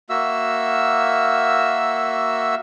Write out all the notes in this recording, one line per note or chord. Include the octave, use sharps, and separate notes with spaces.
A#3 F#4 E5 E6